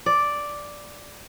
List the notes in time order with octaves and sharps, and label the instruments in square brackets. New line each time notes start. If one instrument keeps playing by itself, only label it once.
[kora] D5